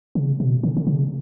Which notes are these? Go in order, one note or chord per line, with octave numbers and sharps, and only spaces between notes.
C#3
B2
D3
D3
C#3